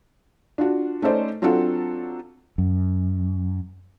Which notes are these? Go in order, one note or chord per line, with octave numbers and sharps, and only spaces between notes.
D4 F4 F#4
A3 C#4 D#4 A4 C5 D5
F#3 C4 D4 F4 A4 F#5
F#2